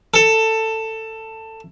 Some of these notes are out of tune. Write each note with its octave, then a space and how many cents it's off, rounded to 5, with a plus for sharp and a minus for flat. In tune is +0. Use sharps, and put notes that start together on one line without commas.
A4 +15